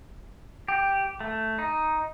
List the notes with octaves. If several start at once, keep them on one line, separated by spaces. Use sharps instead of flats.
G4
A3
D#4